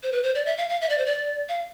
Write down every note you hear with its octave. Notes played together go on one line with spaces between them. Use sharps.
C5
B4
C5
D5
E5
F5
F5
E5
D5
C5
D5
F5